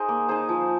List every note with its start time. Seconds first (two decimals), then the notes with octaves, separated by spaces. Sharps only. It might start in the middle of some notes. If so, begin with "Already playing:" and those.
Already playing: D#4 G#4 A#4 C5 D#5
0.09 A#3
0.29 D#4 G#4 C5
0.49 F3